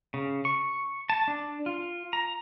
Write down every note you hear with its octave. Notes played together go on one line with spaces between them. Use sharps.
C#3
C#6
A5
D4
F4
A#5